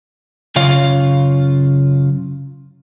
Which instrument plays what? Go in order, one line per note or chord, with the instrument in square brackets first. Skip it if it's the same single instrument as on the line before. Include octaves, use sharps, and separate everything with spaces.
[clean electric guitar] F#2 C#3 F4 C#5 F5